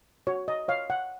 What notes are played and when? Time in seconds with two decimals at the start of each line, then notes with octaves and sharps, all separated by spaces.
0.27 F#4 C#5
0.48 D#5
0.68 C#5 F5
0.90 F#5